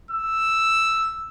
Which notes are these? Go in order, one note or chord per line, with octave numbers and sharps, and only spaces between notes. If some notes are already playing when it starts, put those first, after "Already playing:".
E6